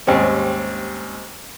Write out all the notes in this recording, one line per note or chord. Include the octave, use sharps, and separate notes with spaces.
D#2 G#2 G3 C4 C#4